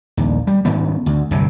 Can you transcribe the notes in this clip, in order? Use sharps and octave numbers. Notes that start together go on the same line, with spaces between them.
A#1 D#2
G3
G#2 D#3 B3 C#4
D2
G1 C2 G2 C3